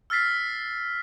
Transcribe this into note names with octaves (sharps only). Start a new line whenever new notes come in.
E6 F6 A6 B6 C7